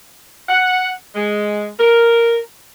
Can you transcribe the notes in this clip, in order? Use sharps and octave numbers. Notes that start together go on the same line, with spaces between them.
F#5
G#3
A#4